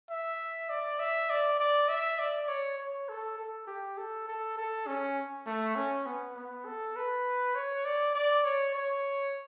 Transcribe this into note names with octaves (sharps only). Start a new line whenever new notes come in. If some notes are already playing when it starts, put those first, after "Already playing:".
E5
D5
E5
D5
D5
E5
D5
C#5
C#5
A4
A4
G4
A4
A4
A4
C#4
A3
C#4
B3
B3
A4
B4
C#5
D5
D5
C#5
C#5